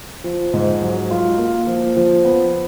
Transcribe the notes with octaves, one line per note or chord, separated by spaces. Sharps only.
F3
G#2
F#3
F4
A#3
F3
F3
B3